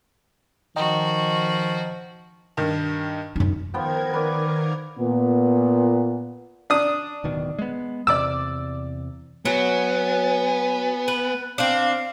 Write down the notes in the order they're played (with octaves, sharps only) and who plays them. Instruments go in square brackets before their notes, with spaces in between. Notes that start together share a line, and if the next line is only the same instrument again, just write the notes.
[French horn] D#3 [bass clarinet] F3 [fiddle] F#4 [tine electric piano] D#5 G5 A#5
[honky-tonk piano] G2 D#3
[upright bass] F#2 D#4
[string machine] D#3 A#4 G#6 [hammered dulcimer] F3 B3 G5
[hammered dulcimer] B4 D5
[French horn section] A#2 B3
[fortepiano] D4 D#6
[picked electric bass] D1 B2 D#3
G#3 B3
[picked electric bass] E2 C3 [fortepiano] D5 D6 E6
[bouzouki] F#3 [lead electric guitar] B3 [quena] G#5
[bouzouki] B4
[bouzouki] C4 D4 [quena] F5